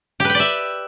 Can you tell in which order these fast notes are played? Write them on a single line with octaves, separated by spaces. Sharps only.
G4 B4 G5 D5 E5